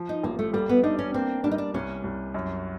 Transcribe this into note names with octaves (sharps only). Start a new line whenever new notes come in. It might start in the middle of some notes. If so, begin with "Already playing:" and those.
Already playing: F3
D#4
A1 A#3
A3
G3 A#3
B3
D4 D#4
C#4
A#3 C4
G3 D4
D#4
D4
C2 C#4
C2
F#2